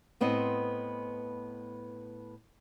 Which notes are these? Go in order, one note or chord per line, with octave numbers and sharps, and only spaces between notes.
A2 B3 C4 C5 D#5